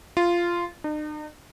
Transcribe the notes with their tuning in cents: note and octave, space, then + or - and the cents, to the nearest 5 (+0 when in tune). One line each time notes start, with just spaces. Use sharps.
F4 -10
D#4 -45